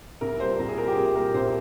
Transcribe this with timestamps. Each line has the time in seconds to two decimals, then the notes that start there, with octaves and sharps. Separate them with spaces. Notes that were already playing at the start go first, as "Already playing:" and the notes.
0.21 C2 A#4
0.40 G3 C5
0.45 A#2
0.59 C2 A#4
0.69 G#4
0.78 A#2 A#4
0.81 G3
0.87 G4
0.96 C2 G#4
1.15 A#2 G3 A#4
1.34 C2 C5